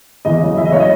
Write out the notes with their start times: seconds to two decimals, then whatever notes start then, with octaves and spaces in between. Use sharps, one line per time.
0.25 E2 D#5
0.42 C#3 F#3
0.57 E2 E5
0.65 D#5
0.72 C#3 F#3 C#5
0.80 D#5